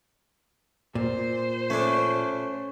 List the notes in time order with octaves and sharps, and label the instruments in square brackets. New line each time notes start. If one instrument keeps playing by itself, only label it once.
[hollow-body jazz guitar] A#2 [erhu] C5
[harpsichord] A3 D4 [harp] C#4